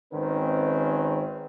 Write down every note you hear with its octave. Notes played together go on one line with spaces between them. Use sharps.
G#1 D#3 C4 C#4 B4